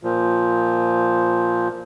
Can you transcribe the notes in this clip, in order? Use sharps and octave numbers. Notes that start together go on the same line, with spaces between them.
A#2 F3